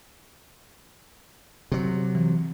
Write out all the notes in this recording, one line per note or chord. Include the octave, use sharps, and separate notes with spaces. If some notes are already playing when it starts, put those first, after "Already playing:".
C3 F#3
E3